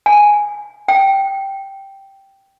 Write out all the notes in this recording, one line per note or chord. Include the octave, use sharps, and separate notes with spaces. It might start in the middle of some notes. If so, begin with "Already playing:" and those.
G#5
G5